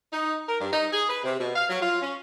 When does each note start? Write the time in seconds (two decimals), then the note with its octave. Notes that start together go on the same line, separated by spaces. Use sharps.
0.12 D#4
0.48 A#4
0.60 G2
0.72 D#4
0.92 G#4
1.09 B4
1.24 C3
1.39 B2
1.56 F5
1.69 F#3
1.81 F4
2.02 C#4